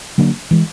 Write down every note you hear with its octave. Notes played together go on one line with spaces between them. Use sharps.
D3 F#3 A#3 D4
E3 G#3